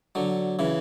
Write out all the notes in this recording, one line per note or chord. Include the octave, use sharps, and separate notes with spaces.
D3 F#3
C#3 E3